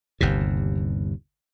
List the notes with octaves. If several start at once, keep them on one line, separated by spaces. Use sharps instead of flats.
G1 D#2 C3